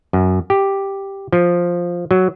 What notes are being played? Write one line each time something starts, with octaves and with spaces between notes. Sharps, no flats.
F#2
G4
F3
F#3